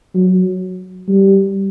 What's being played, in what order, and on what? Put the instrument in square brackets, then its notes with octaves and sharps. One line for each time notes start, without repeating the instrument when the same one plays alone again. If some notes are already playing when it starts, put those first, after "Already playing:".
[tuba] F#3
G3